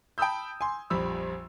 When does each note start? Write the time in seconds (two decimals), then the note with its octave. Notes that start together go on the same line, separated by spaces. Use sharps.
0.18 G5 A5 B5 D#6 E6 G6
0.61 G#5 C6
0.90 A#1 F2 G3 B5 E6